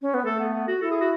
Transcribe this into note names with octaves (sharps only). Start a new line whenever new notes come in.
C#4
B3
A3 A4
B3
B3
F#4
E4 A4
G#4
F#4